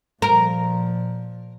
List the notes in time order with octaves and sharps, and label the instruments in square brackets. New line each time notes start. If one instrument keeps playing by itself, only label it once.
[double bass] A#2 F3 [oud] A#4 [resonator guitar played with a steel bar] A#5